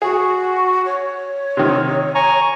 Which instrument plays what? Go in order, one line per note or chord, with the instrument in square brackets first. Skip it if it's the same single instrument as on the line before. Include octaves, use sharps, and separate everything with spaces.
[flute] F#4 [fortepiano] G#4
[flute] C#5
[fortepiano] C3 D#3
[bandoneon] G#5 A#5 C#6